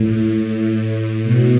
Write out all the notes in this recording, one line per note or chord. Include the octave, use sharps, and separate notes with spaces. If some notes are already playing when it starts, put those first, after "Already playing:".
Already playing: A2
B2